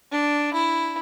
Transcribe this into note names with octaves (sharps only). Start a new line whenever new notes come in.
D4
E4